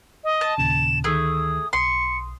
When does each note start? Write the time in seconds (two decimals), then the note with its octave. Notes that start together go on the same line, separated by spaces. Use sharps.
0.24 D#5
0.41 A5
0.58 D#2 A#2 C#3 E7
1.04 D2 D#3 A3 G#4 D#6
1.73 B1 C6 D#6 C#7